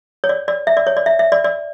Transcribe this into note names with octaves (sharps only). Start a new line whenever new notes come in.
C#5
D5
D5
E5
D5
C#5
D5
E5
E5
D5
D5